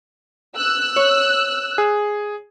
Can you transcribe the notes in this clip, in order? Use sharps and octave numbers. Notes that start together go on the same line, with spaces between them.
E6 F#6
C#5
G#4